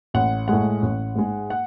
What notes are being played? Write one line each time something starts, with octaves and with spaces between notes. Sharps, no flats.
A1 F#5
A2 G#3 F#5
A1
G#2 G#3
F#5